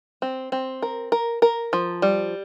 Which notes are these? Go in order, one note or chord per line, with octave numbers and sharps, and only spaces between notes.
C4
C4
A#4
A#4
A#4
F3
G3